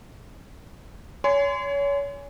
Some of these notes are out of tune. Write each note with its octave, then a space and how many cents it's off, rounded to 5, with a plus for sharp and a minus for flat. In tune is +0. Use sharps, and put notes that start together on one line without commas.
C#5 +30 G#5 +0 C6 -30